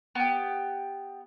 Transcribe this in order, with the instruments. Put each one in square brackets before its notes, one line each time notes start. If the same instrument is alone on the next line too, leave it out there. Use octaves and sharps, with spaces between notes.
[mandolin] B3 G4